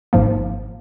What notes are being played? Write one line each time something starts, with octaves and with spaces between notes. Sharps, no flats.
G#1 G#2 F3 A#3